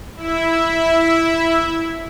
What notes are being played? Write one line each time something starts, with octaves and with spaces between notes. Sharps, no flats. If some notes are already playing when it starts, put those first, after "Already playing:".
E4 E5